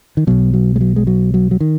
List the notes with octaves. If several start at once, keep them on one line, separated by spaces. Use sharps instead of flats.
D#3
B1 B2 F#3
F#3
G#3
F#3
G#3
F#3
F#3
F#3
D#3